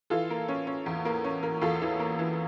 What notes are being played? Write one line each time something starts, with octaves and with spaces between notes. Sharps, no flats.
E3 F4 A4
A#3
C#4
C#4
E2
A#3
C#4
A#3
E2 F4 A4
E3
A#3
E3